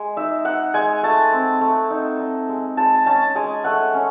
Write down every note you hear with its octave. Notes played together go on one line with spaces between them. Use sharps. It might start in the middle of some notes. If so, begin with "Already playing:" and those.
Already playing: G#3
D#4 E5
D#4 F#5
G#3 G#5
A3 A5
C4
A3
D#4
D#4
G#3
G#3 A5
C#4 A5
G#3 G#5
A3 F#5
C#4